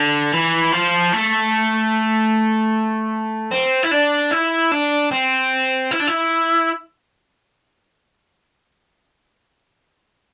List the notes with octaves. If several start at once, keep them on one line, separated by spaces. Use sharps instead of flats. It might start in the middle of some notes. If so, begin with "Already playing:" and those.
Already playing: D3
E3
F3
A3
C4
E4
D4
E4
D4
C4
E4
D4
E4